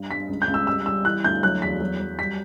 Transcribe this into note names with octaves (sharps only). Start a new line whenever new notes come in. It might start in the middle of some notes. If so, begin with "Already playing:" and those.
Already playing: G2
G2 B6
C#2
G6
C#2
E6
G3 E6
G3 E6
E3 F#6
D2 G6
F#3 F#6
E2 B6
F#3
F#3
G3 B6